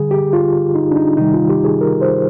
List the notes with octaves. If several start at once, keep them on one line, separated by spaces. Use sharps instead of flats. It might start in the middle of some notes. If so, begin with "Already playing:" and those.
Already playing: D3 G3 G#4
G4
F4
D#4
D4
D#4
C3 D#3 G3 D#4
F4
G4
G#4
A#4
C5